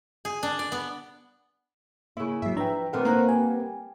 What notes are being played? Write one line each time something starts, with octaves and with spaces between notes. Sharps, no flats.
G#4
D4
D5
B3
C#3 A#3 E4 G#4
G#2 F#3 E5
F3 D4 B4 G5 A#5
A#2 D#3 A3 C4 B4 F#5
D#3 A#3 C5 A#5 F#6
G3 G#5